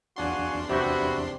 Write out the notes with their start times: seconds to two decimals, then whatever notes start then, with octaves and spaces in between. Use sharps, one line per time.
0.16 E2 D4 F#4 F5 F#5 G#5 C6
0.69 C3 B3 E4 F#4 G4 E5